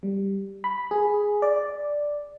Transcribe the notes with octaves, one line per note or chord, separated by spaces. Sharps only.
G3
B5
G#4
D5